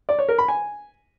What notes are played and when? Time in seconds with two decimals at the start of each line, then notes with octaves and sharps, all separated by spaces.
0.09 D5
0.19 C#5
0.29 A#4
0.38 B5
0.48 G#5